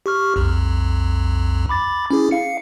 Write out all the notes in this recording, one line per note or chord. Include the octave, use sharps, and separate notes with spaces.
G4 C#6 F6
B1 F2
B5 D6 A6
C#4 E4 G#4
F5 C#7